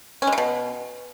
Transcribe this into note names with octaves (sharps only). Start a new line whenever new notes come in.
C#4
G#3
C#3
B2